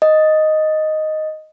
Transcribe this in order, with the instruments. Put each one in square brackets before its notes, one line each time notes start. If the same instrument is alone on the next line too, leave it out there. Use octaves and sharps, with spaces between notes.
[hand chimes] D#5